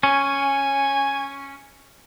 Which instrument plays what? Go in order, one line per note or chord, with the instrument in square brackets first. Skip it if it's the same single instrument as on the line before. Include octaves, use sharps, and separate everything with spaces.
[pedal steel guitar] C#4 [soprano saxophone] G#5